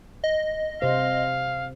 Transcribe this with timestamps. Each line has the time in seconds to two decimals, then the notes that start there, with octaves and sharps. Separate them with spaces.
0.24 D#5
0.82 C3 C5 F5